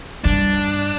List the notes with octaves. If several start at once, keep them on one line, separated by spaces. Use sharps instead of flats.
G2 D4